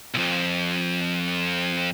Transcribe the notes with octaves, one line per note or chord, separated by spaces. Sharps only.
B1 F2